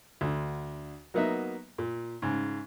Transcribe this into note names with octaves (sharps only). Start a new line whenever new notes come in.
D2 D3
F#3 A#3 B3 D#4 E5
A#2
G#2 C#3